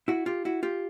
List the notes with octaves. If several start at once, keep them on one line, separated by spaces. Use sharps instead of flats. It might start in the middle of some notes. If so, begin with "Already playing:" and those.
E4 F#4
F4 G4
E4 F#4
F4 G4